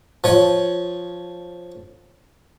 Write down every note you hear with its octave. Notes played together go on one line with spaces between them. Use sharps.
F3 C#5